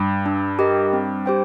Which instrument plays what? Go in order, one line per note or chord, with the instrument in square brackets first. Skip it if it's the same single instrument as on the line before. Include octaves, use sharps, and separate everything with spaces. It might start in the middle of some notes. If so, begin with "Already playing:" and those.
Already playing: [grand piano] G2
[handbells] D4
G4 A#4 D#5
C4
G4 C5 G5